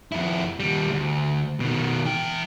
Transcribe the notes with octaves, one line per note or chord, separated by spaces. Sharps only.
F2 E4
D#2 G3
D2
B2 D#3
E3 G5